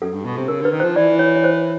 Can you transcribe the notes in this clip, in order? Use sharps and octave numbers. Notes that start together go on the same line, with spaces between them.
F#2 A4
G2
B2
C3
C#3 A#4
D3 B4
D#3
F3 C5
E3 D5
C#5
C#5
C5